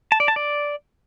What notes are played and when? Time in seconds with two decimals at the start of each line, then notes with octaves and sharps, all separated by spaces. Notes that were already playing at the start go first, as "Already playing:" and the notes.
0.12 A5
0.20 D5
0.28 A5
0.36 D5